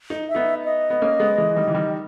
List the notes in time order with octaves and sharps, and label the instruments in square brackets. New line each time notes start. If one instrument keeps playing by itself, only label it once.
[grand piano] D#4
[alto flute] E5
[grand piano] B3 D#4
[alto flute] D#5
[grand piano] B3
A#3 C#4
G#3 B3
E3 G#3
D#3 G3
E3
D#3 G3